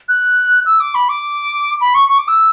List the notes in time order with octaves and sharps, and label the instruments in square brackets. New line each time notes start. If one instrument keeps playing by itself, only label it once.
[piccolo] F#6
E6
D6
B5
D6
B5
C#6
C#6
D6
E6